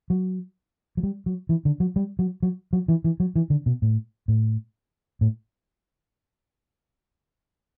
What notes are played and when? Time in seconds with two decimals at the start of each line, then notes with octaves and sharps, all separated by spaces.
0.10 F#3
0.97 F#3
1.03 G3
1.26 F#3
1.49 E3
1.65 D3
1.80 F#3
1.96 G3
2.19 F#3
2.43 F#3
2.73 F#3
2.88 E3
3.04 E3
3.20 F#3
3.35 E3
3.50 D3
3.66 B2
3.82 A2
4.28 A2
5.21 A2